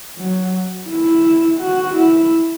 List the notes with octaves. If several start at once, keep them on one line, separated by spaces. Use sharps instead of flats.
F#3
E4
F#4
E4